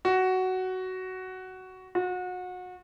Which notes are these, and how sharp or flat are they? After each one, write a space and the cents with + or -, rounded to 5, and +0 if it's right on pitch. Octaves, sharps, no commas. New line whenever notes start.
F#4 +10
F#4 -30